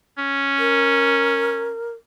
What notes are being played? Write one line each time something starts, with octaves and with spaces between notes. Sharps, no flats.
C#4
A#4